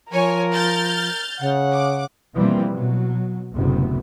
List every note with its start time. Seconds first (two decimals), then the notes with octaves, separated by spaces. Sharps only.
0.12 F3 A#4 C#5 G#5
0.53 F6 G6 A6
1.40 C#3 F#5
1.72 D6
2.34 B2 E3 F3 G3 A#3 C4
2.73 B2 F#3
3.53 F#1 D2 A2 C3 B3